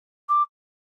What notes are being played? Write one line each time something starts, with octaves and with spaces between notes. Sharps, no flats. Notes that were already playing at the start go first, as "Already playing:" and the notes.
D6